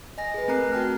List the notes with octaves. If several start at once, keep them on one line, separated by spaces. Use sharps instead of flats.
D#5 G#5 A#6
G#4 B4
A3 C4 A#4 A#5 F#6 C7
F#4 G5 A5 F6